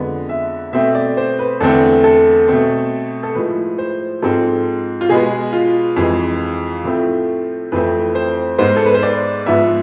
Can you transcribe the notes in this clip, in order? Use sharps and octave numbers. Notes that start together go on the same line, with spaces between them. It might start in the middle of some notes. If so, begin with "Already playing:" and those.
Already playing: F2 D3 G#3 B3
E5
B2 A3 C4 E5
D5
C5
B4
E2 D3 A3 C4 A4
A4
B2 A3 C4
A4
A2 F3 G#3 B4
C5
G#2 F3 G#3 C4 A4
F4
B2 G#3 B3 G#4
F4
F2 E3 G#3
A2 F3 A3 C4
F2 E3 A3 C4 B4
C5
G#2 G#3 B3 C5
A4
B4
C5
D5
G#2 F3 B3 E5